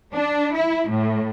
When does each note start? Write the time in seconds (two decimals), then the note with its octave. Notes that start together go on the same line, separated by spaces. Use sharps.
0.14 D4
0.54 E4
0.91 A2